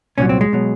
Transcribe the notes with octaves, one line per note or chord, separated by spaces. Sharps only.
C2 A#2 F#3 C#4
C4
G#3
B2 F#3